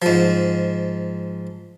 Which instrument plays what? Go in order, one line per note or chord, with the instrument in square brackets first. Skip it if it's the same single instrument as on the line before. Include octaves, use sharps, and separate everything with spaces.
[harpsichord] G#2 F3